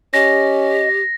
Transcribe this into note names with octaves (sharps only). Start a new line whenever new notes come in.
C#4 G4 D#5 A#6